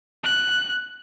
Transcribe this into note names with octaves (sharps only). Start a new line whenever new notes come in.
F#6